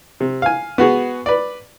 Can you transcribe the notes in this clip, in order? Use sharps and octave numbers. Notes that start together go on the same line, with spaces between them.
C3
F5 G#5
B3 F#4 G#4
B4 D5